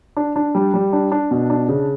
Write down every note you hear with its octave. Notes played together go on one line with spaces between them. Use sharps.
D4
D4
G3
G3
D4
D4
B2
D4
C#3